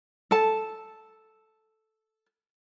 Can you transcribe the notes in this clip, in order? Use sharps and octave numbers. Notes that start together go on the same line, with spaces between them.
A4 A5